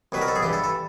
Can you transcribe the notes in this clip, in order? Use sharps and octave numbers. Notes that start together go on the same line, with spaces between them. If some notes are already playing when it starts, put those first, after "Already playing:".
C2 B2 F#3 B4
A#4
A4
G#4
G2 E3 G4
A4
A4